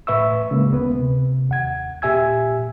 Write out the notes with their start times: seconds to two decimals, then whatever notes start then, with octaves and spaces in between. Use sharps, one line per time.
0.07 A2 B4 E5 C#6 E6
0.51 C#3 G#3 A#3
0.72 D2 B3 B4
0.99 C3
1.49 D#2 F#5 G#6
2.02 A#2 G4 E5 G#5 E6 G#6